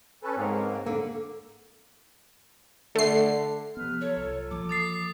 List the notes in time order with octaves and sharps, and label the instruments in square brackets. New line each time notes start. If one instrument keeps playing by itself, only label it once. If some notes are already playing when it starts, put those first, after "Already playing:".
[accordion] C#4 A4 B4
[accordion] G#2 A#3 [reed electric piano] C4 G#4 C#5
[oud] D3 [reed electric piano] A#3
[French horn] D3 [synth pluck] A3 C7
[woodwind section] C3 B4 F6 [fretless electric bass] F3 B3
[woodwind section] F#3 F4 A4 [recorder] C#5
[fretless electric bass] C2
[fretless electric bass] E3 F3 A#3 [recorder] D6
[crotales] D#6 A6 C7